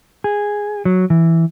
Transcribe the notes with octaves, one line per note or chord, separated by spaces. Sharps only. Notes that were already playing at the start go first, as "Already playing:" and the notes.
G#4
F#3
E3